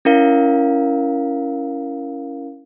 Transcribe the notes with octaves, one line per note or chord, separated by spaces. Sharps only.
C#4 E4 A#4 F5